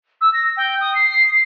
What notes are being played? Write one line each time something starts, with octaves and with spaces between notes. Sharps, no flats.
E6
A#6
G5
D#6
C7